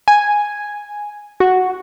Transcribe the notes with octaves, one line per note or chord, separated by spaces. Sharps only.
G#5
F#4